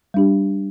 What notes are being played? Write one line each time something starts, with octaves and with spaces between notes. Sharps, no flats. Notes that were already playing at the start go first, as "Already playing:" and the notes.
G3 D4 G4